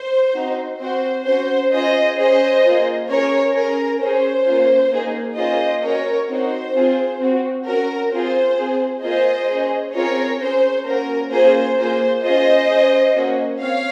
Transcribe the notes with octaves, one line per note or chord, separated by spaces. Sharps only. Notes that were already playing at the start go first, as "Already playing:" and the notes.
Already playing: C5
C4 D#4 F#4
C4 F#4 C5
C#4 F#4 C5
C#4 F4 G#4 C5 D#5
C#4 G#4 C5 D#5
A#3 F4 G#4
C#4 G#4 A#4 C#5
C#4 G#4 A#4
C#4 G#4 C5
A#3 C#4 F4
A#3 D#4 G#4
A#3 C#4 F4 G#4 C5 D#5
C#4 F#4 A#4 C#5
C4 D#4 F#4 C5
C4 F4 G#4
C4 F#4
C#4 F#4 A#4
C4 F4 G#4 C5
C4 F4 G#4
A#3 F4 G#4 C5 D#5
C#4 G#4
C4 F4 G#4 A#4 C#5
C#4 G#4 C5
A#3 C#4 F#4 A#4
A#3 C#4 F4 G#4 C5
A#3 F4 G#4 C5
C#4 F4 G#4 C5 D#5
C#4 G#4
A#3 C#4 F#4
C4 C#5 F5